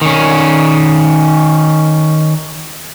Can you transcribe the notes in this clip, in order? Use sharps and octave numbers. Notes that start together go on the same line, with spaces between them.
D#3 C#4